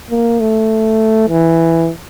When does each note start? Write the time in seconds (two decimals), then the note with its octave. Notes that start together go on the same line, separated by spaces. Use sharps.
0.10 A#3
0.40 A3
1.29 E3